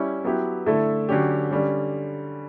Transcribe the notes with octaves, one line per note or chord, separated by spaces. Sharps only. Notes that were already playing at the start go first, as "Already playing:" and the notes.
Already playing: G3 C#4 E4
F#3 B3 E4 G4
D3 A3 E4 A4
D3 F#3 C#4 G4
D3 G3 C#4